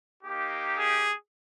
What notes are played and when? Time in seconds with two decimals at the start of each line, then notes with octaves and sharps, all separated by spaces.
0.23 A#3 D#4 G4
0.79 G#4